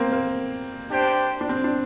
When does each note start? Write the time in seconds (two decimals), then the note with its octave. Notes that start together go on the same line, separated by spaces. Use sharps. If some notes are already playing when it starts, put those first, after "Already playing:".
Already playing: A#3 C4
0.13 A#3
0.91 D4 G4 C5 G5
1.41 D4
1.49 C4
1.64 D4